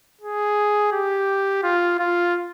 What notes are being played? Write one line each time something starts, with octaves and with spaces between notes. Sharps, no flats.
G#4
G4
F4
F4